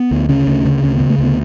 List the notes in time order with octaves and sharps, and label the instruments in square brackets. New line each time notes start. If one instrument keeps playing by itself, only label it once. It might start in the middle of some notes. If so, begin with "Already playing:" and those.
Already playing: [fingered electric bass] B3
D2
C#3 C#4
D2
C#3
D2 C#4
C#3 B3
A3
D2 B3